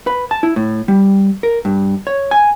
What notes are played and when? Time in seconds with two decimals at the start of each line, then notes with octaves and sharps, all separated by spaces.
0.07 B4
0.31 A5
0.43 E4
0.56 A2
0.88 G3
1.43 A#4
1.65 G2
2.07 C#5
2.31 G#5